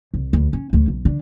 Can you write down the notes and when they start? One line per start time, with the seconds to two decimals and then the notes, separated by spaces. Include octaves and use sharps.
0.14 C2
0.33 D2
0.53 C#4
0.73 D2 A3
0.88 B1
1.05 D3